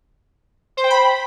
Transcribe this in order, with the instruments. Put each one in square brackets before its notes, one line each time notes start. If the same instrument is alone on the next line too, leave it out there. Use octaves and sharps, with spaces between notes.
[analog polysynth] C5
G5
B5